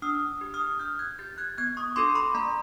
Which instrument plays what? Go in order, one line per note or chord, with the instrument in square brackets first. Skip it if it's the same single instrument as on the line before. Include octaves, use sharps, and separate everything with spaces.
[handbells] D4 D#6 F6
G4
D#6 F6
D4 F6 G6
F#6 G#6
G4 G6 A6
F#6 G#6
B3 F#6 G#6
C#6 D#6
D4 F#4 A4 C6 D6
B5 C#6
A#3 A#5 C6